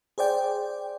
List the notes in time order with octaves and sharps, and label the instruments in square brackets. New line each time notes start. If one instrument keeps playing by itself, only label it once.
[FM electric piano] G#4 C5 D5 G5